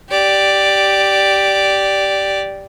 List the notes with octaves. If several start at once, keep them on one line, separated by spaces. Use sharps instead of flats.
G4 D5